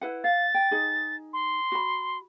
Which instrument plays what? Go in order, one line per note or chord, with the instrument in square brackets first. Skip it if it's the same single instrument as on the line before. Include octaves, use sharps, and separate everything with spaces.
[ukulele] E4 B4 F#5
[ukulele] F5 [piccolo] A6
[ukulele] G5
D#4 G#4
[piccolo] C6
[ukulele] F#4 B5